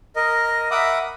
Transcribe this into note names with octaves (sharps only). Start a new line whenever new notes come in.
A#4 D#5
A#4 E5 F#5 B5 D6 D#6